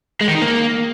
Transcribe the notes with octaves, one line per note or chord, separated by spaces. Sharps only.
G#3
D#3
D#4
A#3